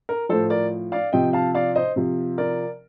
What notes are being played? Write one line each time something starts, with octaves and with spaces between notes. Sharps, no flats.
A#4
A2 F3 A4 C5
A#4 D5
D5 F5
C3 F3 D#5 G5
F5 A5
D5 F5
C5 D#5
C3 F3
A#4 D5